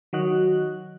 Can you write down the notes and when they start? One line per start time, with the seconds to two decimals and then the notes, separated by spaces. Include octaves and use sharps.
0.13 D#3 F#3 F#4 D#5 F#6